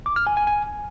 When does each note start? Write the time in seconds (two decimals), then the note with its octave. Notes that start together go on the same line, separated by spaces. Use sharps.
0.06 D6
0.16 F6
0.27 G#5
0.37 G#5
0.47 G#5